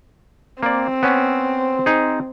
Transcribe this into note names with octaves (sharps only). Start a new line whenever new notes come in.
A#3 C4 D5
B3 C#4
D#4 G#4